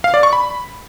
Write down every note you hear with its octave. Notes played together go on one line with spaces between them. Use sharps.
F5
D5
C#6
B5